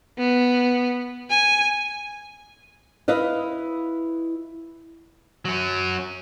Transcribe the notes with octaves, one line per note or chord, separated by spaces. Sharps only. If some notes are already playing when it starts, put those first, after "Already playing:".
B3
G#5
E4 B4 D#5 F5
F#3 C#4